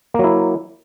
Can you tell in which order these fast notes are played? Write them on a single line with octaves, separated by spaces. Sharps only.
A#3 F#3 E4